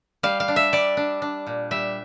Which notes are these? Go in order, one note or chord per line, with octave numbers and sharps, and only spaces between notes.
G3 F5
F5
D4
E5
G3 D5
D4
D4
A#2
G3 E5